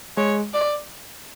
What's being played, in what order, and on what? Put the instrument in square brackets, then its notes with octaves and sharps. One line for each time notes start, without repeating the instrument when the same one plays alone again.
[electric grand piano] G#3 [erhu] C#5
[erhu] D5